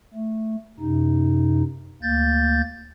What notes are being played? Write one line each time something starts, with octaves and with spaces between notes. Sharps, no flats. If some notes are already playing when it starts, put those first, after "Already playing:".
A3
F#2 C3 D#4
D2 A#3 G6 A6